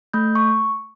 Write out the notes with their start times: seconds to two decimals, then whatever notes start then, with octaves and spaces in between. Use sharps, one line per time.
0.13 A3 G6
0.35 C#6